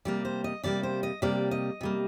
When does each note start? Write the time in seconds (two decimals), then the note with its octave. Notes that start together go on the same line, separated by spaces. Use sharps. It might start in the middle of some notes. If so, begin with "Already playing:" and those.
0.05 C3 G3 A#3 D5
0.25 C5
0.44 D#5
0.63 C3 G3 A#3 D5
0.83 C5
1.03 D#5
1.22 C3 G3 A#3 D5
1.51 D#5
1.81 C3 G3 A#3